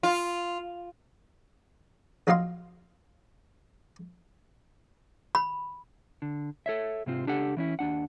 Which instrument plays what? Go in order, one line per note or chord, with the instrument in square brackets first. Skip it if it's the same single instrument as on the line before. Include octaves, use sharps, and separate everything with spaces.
[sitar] F4
[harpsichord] A#1 F#3 F4 D#5 F5 C6
[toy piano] B5
[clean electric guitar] D3
A4 C#5 E5
G#2 C3 C4 F4
C#2 D4 G4 A4 F#5
E3 C#4 E4
D#2 D4 F#5